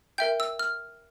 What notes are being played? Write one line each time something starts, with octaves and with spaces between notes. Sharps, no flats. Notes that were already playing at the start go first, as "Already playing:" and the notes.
A#4 E5 G5 G6
E6
F6